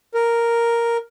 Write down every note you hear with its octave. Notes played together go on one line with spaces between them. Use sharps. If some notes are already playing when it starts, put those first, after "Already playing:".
A#4